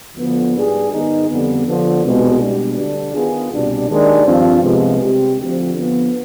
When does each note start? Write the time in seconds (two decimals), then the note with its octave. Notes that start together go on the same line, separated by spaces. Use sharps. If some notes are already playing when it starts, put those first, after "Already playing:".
0.16 D2 D3 F3 B3
0.54 G#2 G3 D4 G#4
0.90 G#2 D#3 B3 D#4 G#4
1.27 F2 D3 G3 B3
1.65 D3 F3 B3
2.03 C2 B2 G#3 B3
2.39 B2 G3 D4
2.77 D2 D3 G3 D4
3.14 D#3 B3 F4 G#4
3.51 C2 B2 G3 D4
3.88 D#2 D#3 G#3 D4
4.25 G2 F3 C4 F4
4.62 C2 C3 F3 G#3 B3
5.00 C3 G3 C4 G4
5.36 D2 D3 F3 C4
5.74 D3 F3 B3